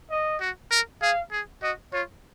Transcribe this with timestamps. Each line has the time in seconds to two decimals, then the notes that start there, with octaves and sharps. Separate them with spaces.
0.10 D#5
0.41 F#4
0.71 A#4
1.01 G#4 F5
1.32 G#4
1.63 F#4 D#5
1.93 F4 C#5